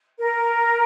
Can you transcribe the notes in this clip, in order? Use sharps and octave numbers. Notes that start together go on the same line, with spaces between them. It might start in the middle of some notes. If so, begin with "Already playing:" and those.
A#4